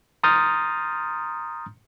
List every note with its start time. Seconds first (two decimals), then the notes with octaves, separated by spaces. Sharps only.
0.23 A#5 C6 D#6 F6 G6 A6